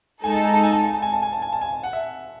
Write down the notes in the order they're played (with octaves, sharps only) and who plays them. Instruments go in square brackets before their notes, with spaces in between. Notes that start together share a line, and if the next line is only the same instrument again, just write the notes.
[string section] G#3 D#4 A4 [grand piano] G#5
[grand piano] A5
G#5
A5
G#5
A5
G#5
A5
G#5
A5
G#5
A5
G#5
A5
G#5
F#5
E5